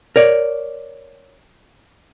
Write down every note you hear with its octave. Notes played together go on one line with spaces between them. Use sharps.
A#4 C#5 D5